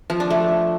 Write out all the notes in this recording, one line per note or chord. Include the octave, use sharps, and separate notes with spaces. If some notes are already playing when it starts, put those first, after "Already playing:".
F3
D4
A3